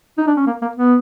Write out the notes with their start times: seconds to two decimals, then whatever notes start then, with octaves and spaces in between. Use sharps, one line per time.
0.18 D#4
0.27 D4
0.37 C#4
0.46 A#3
0.62 A#3
0.76 B3